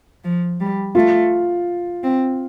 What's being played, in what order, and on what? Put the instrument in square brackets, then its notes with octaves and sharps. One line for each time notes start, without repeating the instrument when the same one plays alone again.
[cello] F3
G3
[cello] A3 [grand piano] F4
[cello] C4